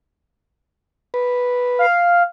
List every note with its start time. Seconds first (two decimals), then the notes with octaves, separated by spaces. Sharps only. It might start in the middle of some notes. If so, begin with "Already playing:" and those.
1.14 B4
1.79 F5